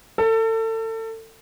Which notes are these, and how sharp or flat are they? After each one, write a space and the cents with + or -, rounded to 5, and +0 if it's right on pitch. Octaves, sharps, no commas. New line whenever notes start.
A4 +30